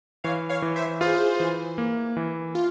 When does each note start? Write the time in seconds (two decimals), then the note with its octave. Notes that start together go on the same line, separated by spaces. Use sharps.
0.24 E3 C#5 F5
0.49 C#5 F5
0.62 E3
0.76 C5 E5
1.01 F4 G#4 C5
1.40 E3
1.78 A#3
2.17 E3
2.55 F4